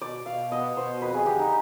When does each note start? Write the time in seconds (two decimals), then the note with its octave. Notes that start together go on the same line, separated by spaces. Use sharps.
0.01 B2 D5
0.26 B2 F5
0.51 B3 D#5
0.76 B2 C5
1.02 F2 B4
1.14 G#4
1.26 D3 G4
1.39 D#4